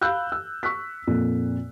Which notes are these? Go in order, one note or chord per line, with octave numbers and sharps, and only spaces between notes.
F5 B5 E6 F#6 G6
E6
C#6 E6 F#6 B6
F2 A#2